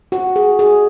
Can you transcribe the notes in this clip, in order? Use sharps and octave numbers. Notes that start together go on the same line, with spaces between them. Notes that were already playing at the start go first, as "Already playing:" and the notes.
F#4
G#4
G#4